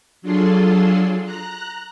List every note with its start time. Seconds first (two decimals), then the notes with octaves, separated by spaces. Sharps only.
0.22 F#3 D4 F4 G#4 A4 C6
1.25 A#5 F#6